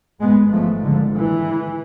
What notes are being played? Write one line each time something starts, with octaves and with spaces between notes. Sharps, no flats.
G#1 G#2 G#3 B3
F3 A3
D3 F3
E3